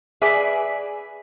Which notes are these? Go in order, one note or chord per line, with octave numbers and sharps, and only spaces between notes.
G#4 B4 D5 E5 G#5